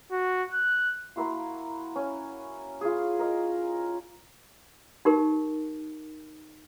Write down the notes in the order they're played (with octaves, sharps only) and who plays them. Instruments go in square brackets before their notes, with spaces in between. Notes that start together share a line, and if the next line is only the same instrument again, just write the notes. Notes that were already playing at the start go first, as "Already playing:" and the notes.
[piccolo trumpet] F#4
F#6
[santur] A#3 E4 F#4 C6
C#4
F4 G#4
A#4 D#5
[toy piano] D#4 G4 A#4